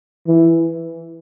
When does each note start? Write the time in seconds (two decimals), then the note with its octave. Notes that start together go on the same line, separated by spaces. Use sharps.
0.27 E3